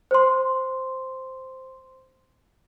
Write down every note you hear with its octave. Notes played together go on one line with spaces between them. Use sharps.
C5 C6